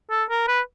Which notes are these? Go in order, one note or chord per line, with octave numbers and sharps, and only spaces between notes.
A4
A#4
B4